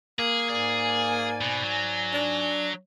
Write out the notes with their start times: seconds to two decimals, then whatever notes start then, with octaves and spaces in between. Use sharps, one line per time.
0.19 A#3 G#4
0.49 G#2 G#4 D5 G#5
1.41 B2
1.64 F#3
2.13 D4